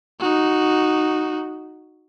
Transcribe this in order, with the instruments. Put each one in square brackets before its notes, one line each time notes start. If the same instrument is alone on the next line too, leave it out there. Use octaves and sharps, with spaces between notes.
[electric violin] D#4 F#4